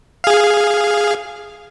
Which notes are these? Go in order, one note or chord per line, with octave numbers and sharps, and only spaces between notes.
G#4 F5